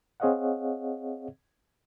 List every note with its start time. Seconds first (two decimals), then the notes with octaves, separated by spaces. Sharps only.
0.20 C4 G#4 C#5 D#5 F5 F#5